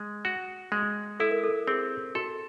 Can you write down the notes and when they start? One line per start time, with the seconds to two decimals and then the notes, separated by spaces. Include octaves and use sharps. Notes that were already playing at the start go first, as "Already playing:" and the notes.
Already playing: G#3
0.25 F#4
0.72 G#3
1.20 E4 A4
1.31 A#4
1.43 A4
1.68 C4 G#4
2.15 F#4 A4